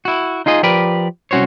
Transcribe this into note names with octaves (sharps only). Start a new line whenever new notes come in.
E4 F#4
D#4 F4 G#4 D#5
F3 G4 A#4 B4 D5
C2 C#4 F#4 C5 C#5